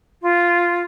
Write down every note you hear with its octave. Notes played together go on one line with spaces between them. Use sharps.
F4